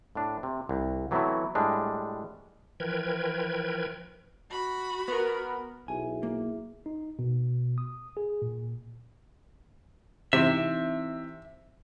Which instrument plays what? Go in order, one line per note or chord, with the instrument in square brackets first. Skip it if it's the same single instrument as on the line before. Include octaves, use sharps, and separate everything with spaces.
[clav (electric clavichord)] A2 D4
C3
C2
E3 F#3 A3 B3 C4 E4
A2 G3 G#3 D4
[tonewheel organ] E3 F3 A#4 B4 G5 G#6
[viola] F#4 B5
[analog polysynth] B3 A#4
[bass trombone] B1 [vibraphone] E4 G#4 E5 [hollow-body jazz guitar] G#5
[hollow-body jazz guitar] A#3
[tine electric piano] D#4
B2
D#6
G#4
A#2
[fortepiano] C3 [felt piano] E3 C4 D#4 [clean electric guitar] E5